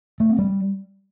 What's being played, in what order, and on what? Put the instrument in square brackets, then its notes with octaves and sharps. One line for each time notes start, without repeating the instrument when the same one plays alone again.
[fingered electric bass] A3
C4
G3